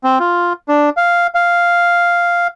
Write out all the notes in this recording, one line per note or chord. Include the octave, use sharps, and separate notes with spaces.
C4
F4
D4
F5
F5